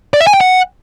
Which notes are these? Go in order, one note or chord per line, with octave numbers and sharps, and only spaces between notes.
D5
E5
G#5
G5
F#5